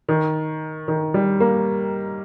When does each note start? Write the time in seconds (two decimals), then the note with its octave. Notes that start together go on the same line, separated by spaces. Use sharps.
0.09 D#3
0.88 D#3
1.14 G3
1.40 A#3